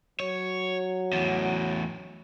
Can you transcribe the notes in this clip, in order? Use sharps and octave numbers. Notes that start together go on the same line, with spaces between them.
F#3 C#5
E2 A2